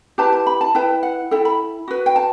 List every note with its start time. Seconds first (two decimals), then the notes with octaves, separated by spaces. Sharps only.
0.18 E4 G4 B4 A5
0.32 A5
0.47 B5
0.61 A5
0.75 E4 B4 G5
1.03 F#5
1.31 E4 A4 G5
1.45 B5
1.88 F#4 B4
2.06 G5
2.16 A5